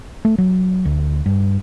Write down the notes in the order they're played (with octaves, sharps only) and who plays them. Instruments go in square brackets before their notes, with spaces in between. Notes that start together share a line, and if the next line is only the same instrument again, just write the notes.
[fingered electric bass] A3
F#3
D2
G2